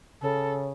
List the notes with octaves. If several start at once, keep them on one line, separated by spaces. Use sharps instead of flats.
C#3 A4